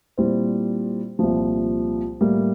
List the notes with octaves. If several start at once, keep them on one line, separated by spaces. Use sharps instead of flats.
A#2 G3 C4 E4
C2 A#2 F3
A2 G3 A#3